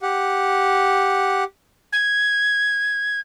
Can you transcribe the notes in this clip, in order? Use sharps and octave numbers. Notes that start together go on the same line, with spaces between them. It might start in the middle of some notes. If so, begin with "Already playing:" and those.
G4 F#5
G#6